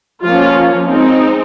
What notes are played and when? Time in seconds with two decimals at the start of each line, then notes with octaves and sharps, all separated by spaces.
0.23 F3 A#3 C#4 F4
0.88 G#3 C4 D#4